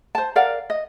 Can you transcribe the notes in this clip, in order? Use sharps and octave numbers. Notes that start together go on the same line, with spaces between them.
C5 A5
A#4 D5 F5 F#5
D#5